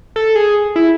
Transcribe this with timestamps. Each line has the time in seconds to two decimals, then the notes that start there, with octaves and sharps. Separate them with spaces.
0.16 A4
0.36 G#4
0.76 E4